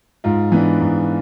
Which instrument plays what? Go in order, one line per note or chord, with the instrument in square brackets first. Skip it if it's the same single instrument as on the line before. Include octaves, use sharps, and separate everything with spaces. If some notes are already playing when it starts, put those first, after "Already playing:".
[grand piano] G#2 F4
E3 B3 D4
G#2